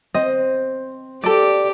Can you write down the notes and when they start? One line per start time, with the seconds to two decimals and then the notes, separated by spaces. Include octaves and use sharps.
0.14 C4 D#5
1.24 G4 A4 D5